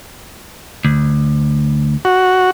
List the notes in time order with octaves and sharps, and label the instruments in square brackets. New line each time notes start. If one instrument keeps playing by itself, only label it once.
[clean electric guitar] D2
[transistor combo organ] F#4